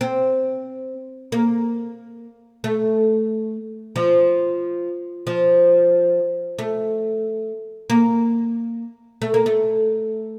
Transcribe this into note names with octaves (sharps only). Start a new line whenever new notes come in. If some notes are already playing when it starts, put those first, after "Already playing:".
C4
A#3
A3
F3
F3
A3
A#3
A3
A#3
A3